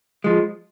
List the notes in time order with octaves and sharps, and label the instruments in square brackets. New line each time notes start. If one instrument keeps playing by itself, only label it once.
[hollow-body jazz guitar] F3 G#3